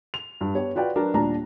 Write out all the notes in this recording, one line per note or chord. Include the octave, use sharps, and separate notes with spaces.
F7
G2
B3 G4 C#5
F4 F#4 B4 D5 F5 G5
F#3 D4 A#4 B4
D#2 A#2 G3 D4 A5 A#5